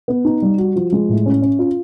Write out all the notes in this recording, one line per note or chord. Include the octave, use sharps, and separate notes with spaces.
B3
D#4
G3
F#4
F3
G#3
A2
C#4
C#4
F4